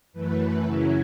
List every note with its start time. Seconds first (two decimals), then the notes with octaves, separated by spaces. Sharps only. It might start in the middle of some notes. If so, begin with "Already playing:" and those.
0.13 F#2 E3 A3 B4
0.63 F#2 C#3 F#3 C#4 E4